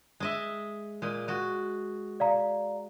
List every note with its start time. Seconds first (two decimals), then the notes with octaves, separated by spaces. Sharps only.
0.20 G#3 D#5 E5
1.02 A#2 G#3
1.28 G#3 F#4
2.20 D5 F5 A#5